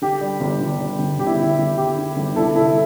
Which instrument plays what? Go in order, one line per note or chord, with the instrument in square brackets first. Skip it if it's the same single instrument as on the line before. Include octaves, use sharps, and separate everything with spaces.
[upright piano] D3 G4
G3
G1
G1
G3
G1
G1 G4
E4
D3 E4
G1
D3 G4
D3
G1
C2 E4 A4
C2 E4 A4